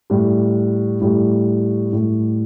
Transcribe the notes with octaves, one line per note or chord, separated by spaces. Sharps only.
A2 G3
A2 G3
A2 G3